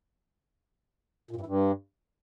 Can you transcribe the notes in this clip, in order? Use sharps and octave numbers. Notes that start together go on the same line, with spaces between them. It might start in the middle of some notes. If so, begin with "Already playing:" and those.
A#2
G2
E3
G2